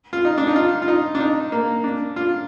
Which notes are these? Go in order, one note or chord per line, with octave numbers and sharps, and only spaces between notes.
F4
D#4
D4
D#4
F4
F4
D#4
D4
D#4
A#3
D4
F4